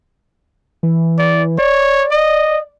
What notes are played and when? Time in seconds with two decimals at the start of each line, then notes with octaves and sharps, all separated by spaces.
0.83 E3
1.18 D5
1.59 C#5 D5
2.11 D#5